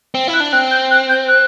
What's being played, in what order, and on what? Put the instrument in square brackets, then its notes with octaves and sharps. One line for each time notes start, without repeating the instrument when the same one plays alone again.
[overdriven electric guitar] C4
E4
[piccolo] F#6
[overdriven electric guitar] D4
[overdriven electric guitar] C4 [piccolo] F#6
[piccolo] G6
F#6
G6
F#6